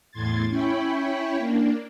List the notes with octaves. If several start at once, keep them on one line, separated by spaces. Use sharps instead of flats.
E2 A2 C6 G#6 A6
C#4 E4 C#5 G5 B5
A#3 D4